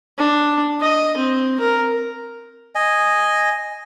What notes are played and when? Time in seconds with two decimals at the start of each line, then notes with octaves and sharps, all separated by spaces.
0.18 D4
0.81 D#5
1.17 C4
1.60 A#4
2.75 D#5 G#5